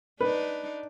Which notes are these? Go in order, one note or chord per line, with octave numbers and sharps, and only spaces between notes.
D4 D#4 B4